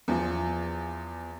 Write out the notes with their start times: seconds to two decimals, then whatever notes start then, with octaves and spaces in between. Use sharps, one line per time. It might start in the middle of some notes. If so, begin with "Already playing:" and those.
0.08 E2 F3